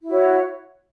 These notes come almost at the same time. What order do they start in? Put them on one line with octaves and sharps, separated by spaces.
E4 F#4 C#5